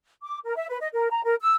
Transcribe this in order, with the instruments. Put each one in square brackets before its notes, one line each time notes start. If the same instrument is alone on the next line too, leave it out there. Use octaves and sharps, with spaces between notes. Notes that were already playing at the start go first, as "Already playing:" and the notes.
[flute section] D6
A#4
E5
B4
D#5
A#4
A#5
A#4
E6